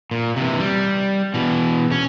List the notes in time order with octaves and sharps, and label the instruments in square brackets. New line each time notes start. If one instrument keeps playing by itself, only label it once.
[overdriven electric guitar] A#2
C3 E3
G3
B2 E3
C#4